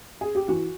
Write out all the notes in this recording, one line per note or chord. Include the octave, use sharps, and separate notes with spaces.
G#4
G4
E3 F#4